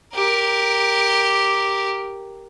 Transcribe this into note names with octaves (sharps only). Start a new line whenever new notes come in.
G4 A#4